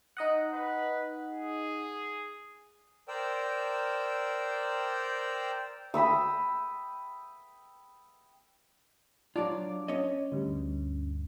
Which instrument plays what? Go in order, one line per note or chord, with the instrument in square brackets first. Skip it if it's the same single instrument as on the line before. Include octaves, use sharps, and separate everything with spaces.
[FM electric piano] D#4 D#5 F#5
[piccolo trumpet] B4
G#4
[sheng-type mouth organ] A#4 C5 D5 G5 E6
[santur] G5 B5 D#6 E6
[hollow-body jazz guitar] F#3 F4 [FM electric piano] D4 D5 D6
[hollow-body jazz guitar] C#4 C#5 D#5
[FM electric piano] D2 G2